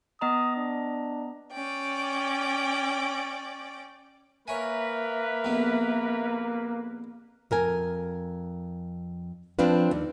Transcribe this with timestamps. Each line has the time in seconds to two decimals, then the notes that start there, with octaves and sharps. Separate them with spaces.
0.21 B3 D#5 A#5 D#6
0.56 D4
1.53 C#4 D5 G5
4.48 A#3 A#4 B4 C#5 E5 G#5
5.44 A#1 F2 B3
7.51 F2 A#4 G#5
9.59 F3 C4 D4 F4 B4
9.91 D#2